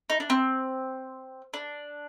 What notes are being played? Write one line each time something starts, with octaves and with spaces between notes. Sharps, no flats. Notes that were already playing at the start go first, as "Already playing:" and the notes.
D#4
D4
C4
D4